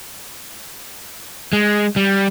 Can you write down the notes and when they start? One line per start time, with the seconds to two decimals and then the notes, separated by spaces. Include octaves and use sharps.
1.53 G#3
1.96 G3